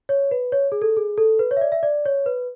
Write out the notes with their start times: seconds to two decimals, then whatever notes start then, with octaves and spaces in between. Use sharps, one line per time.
0.09 C#5
0.31 B4
0.52 C#5
0.72 G#4
0.82 A4
0.97 G#4
1.18 A4
1.39 B4
1.51 C#5
1.57 E5
1.61 D5
1.72 E5
1.83 D5
2.05 C#5
2.26 B4